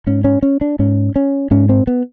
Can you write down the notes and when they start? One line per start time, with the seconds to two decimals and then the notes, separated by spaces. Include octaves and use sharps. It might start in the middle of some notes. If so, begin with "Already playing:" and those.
0.07 G#2 C#4
0.24 C#4
0.43 C#4
0.61 D4
0.79 G#2 C#4
1.16 C#4
1.51 G#2 C#4
1.69 C4
1.87 B3